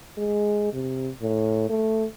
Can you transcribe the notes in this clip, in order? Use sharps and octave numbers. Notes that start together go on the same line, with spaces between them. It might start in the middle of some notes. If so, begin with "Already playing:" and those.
G#3
C3
A2
A3